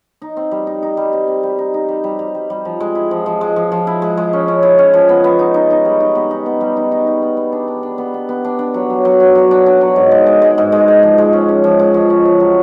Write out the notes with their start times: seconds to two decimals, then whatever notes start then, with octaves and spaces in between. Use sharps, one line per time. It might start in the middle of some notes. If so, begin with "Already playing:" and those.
0.22 D#4
0.37 C4
0.51 G3
0.67 D#4
0.83 D#4
0.97 G3
1.13 C4
1.28 C4
1.43 G3
1.58 D#4
1.74 D#4
1.88 G3
2.04 G3
2.19 G3
2.35 G3
2.50 G3
2.65 F3
2.80 G#3
2.95 E4
3.11 F3
3.26 F3
3.41 G#3
3.56 F3
3.72 F3
3.87 E4
4.02 G#3
4.17 G#3
4.33 C#4
4.48 C#4
4.63 E4
4.79 C#4
4.94 F3
5.09 B3
5.24 B3
5.39 D#4
5.54 D#4
5.70 D#4
5.85 G3
6.00 D#4
6.15 B3
6.31 D#4
6.46 B3
6.61 G3
6.77 D#4
6.92 D#4
7.07 D#4
7.22 B3
7.37 B3
7.52 D4
7.68 D4
7.83 D4
7.98 B3
8.14 B3
8.29 B3
8.45 D4
8.59 D4
8.74 F#3
8.90 F#3
9.05 F#3
9.20 F#3
9.35 F#3
9.51 D4
9.66 D4
9.81 F#3
9.96 G#2
10.11 G#3
10.26 G#3
10.42 G#3
10.58 G#2
10.72 G#3
10.88 G#3
11.03 F3
11.18 G#3
11.33 C#4
11.49 C#4
11.64 F3
11.79 G#3
11.94 F3
12.10 C#4
12.25 F3
12.40 F#3